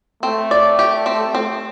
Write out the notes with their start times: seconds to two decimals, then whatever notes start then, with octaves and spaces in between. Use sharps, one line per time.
0.23 A3 C4
0.51 D5
0.79 G4
1.06 C4
1.35 C4